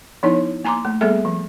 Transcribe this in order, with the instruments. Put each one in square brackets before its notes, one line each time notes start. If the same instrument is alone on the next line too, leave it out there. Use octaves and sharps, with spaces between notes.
[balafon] F3 B3 D#4 E4 C#5
A#3 G#5 A#5 C6 D6
A3
G3 A#3 B3 G#4 A4 E5
F3